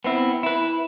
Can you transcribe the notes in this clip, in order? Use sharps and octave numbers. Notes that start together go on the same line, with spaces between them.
B3 C4 E4
E4 B4